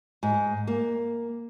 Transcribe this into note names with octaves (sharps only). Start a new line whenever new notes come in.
G#2
A#3